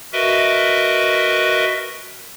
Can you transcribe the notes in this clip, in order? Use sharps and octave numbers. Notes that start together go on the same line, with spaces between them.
F#4 A#4 B4 D#5 E5